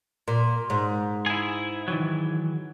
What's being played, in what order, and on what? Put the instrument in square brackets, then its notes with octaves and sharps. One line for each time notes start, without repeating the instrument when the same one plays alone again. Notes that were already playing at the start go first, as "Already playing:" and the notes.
[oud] A#2
G#2
[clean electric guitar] E4 G#4
D#3 E3 F#3